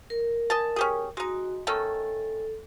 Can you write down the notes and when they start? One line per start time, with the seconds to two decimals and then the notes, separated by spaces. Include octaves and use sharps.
0.10 A#4
0.50 D#5 G#5 A5
0.76 C#4 G4 G#4
1.17 G#3 D#4 F#4
1.67 D#3 A3 C#4 A4